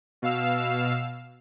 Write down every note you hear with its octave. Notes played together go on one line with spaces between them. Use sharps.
B2 F5 E6